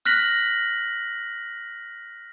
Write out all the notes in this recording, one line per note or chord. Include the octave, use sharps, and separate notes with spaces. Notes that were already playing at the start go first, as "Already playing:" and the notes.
F6 F#6 A#6 B6 F#7